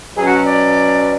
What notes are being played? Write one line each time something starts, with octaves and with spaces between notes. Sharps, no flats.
B2 F#3 C#4 G#4
F#4
D5